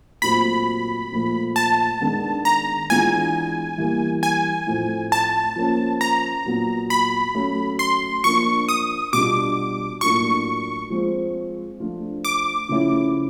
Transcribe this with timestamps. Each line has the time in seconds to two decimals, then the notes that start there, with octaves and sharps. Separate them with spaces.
0.22 A#2 F#3 A3 C4 F4 B5
1.12 A#2 F3 A3
1.56 A5
2.00 D#3 G#3 B3 D4
2.45 A#5
2.90 E3 G#3 B3 D4 F4 G#5
3.78 E3 G3 A#3
4.23 G#5
4.67 A2 F3 A3 C4
5.12 A5
5.56 F3 A#3 C#4
6.01 A#5
6.45 A#2 F#3 B3
6.90 B5
7.34 F#3 A3 C#4
7.79 C6
8.24 F3 A#3 D4 C#6
8.69 D#6
9.13 B2 G3 B3 D4 F4 D6
10.01 A2 F#3 A#3 D4 F4 C#6
10.90 F3 G#3 C4
11.80 F3 A3 D4 F4
12.25 D6
12.69 C#3 F3 A3 C#4 E4